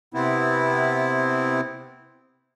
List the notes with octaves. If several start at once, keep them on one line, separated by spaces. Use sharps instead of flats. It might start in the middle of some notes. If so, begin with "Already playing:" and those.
C3 B3 C4 E4